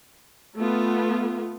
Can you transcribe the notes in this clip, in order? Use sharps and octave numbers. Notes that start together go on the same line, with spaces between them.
A3 B3 F4